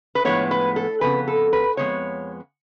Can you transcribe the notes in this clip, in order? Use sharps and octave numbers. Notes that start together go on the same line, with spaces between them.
B4
A2 F3 G#3 B3 C#5
B4
A4
F2 C#3 B3 B4
A4
B4
F2 F3 G#3 B3 C#5